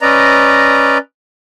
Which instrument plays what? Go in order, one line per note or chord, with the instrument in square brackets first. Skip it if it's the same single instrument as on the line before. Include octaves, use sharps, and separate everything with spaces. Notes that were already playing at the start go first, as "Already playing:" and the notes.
[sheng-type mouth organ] C#4 B4 D5 D#5 A#5